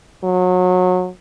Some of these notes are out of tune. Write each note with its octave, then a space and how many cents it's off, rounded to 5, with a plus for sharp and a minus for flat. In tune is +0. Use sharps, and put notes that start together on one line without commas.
F#3 -25